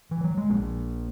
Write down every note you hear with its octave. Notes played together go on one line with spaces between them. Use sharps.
E3
F#3
G#3
A#1 A#2 A#3